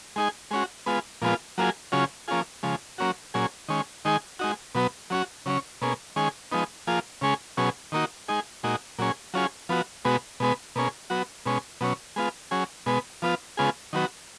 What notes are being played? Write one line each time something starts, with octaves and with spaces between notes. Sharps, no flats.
G#3 D#4 G#4
G#3 C#4 F#4
G#3 B3 F4
A#2 F3 G#3 B3 F4
F#3 A#3 F4 G#4
C#3 F#3 C#4 F4 G#4
F3 A#3 C#4 F4 G#4
C#3 F3 G#3
F#3 A#3 C#4 F#4
A#2 F#3 C#4 G#4
D#3 G#3 C#4
D#3 G#3 D#4 G#4
G#3 D#4 F#4
B2 F#3 B3
F#3 C#4 F#4
C#3 F#3 C#4
B2 A#3 C#4 G#4
D#3 G#3 C#4 G#4
F3 G#3 B3 D#4
F3 A#3 F4 G#4
C#3 G#3 C#4 G#4
B2 F#3 C#4 G#4
D#3 A#3 D#4 F#4
G#3 D#4 G#4
A#2 G#3 D#4 F#4
A#2 F#3 C#4 G#4
F#3 C#4 F4 G#4
F3 B3 F#4
B2 G#3 B3 F#4
B2 G#3 B3
B2 A#3 C#4 G#4
F#3 B3 F#4
B2 G#3 C#4
B2 F#3 C#4
G#3 B3 F4
F#3 C#4 G#4
B2 G#3 B3
F3 B3 F4
C#3 G#3 B3 F4 G#4
D#3 F#3 B3 F#4